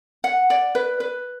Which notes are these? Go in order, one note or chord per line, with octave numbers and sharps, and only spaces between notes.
F#5
D5
B4
B4